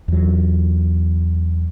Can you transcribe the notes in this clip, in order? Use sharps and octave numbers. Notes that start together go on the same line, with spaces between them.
E2 F#3